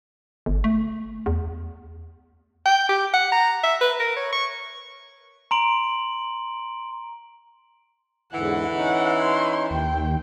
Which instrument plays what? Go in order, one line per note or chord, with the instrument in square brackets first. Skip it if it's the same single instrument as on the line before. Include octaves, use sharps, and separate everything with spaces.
[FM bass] G1
A3
E2
[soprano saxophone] G5
G4
F#5
A#5
E5
B4
A#4
C#5
C#6
[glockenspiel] A#5 C6 D7 F#7
[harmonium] E2 G#2 D3 [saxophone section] E3 [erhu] F#5
[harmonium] C#4 D#4 [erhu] F#5
[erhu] C6
[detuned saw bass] D#2 [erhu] G5